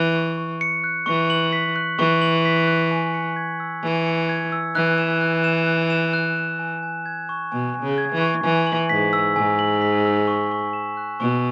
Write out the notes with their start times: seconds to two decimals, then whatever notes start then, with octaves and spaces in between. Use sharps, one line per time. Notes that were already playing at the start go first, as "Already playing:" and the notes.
Already playing: E3 F#6
0.15 C#6
0.38 C#6
0.61 C#7
0.84 F#6
1.06 E3 C#6
1.30 F#7
1.53 B6
1.76 F#6
1.98 E3 C#6
2.22 F#7
2.45 B6
2.67 F#6
2.91 G#5
3.14 C#7
3.36 G#6
3.60 E6
3.83 E3 G#5
4.06 C#7
4.29 G#6
4.52 E6
4.75 E3 F#6
4.98 E7
5.21 F#6
5.44 E7
5.67 F#6
5.90 E7
6.13 F#6
6.36 E7
6.59 G#5
6.83 G#5
7.06 G#6
7.29 C#6
7.52 B2 G#5
7.75 G#5
7.83 C#3
7.98 G#6
8.13 E3
8.21 C#6
8.44 E3 G#5
8.67 F#7
8.89 G#2 B6
9.13 E6
9.36 G#2 G#5
9.59 F#7
9.82 B6
10.05 E6
10.28 C#6
10.51 C#6
10.73 E7
10.97 F#6
11.20 B2 C#6